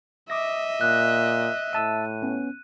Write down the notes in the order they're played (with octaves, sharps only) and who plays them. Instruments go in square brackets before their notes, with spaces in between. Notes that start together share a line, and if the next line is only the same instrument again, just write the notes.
[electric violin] D#5 E5 [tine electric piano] D6 D#6 A#6
[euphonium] A#2 [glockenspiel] F#6
[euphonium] A2 [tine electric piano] E5 A5 E6 [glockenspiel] D#7
[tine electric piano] B3 C#4